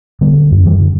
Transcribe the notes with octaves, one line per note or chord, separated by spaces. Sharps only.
D3 G3 B3
F#2
E3 G3
D3